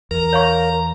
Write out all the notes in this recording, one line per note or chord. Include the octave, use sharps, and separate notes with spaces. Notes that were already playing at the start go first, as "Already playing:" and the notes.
E2 A#4 A#5
C#5 F5 C#6